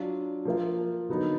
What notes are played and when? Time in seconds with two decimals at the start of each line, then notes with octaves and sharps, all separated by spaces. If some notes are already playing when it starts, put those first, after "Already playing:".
Already playing: F#3 D4 F4
0.45 F3 A#3 F4
1.09 D3 F#3 B3 D#4